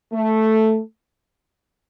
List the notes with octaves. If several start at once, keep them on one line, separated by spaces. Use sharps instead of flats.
A3